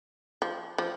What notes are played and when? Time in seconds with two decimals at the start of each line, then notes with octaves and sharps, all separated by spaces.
0.42 F3
0.78 F3